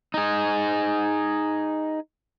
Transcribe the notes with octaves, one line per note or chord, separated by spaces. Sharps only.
D#4 G#4